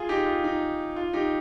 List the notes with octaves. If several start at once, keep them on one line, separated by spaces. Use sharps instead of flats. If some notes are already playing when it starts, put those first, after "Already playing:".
Already playing: F4 G#4
D#4 G4
F4
D#4
F4
D#4 G4